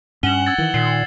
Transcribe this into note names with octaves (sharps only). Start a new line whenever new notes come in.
G2 C#4 F#5 E7 F#7 G7
E6 G#6 A6
D#3 E3
A#2 D#3 C7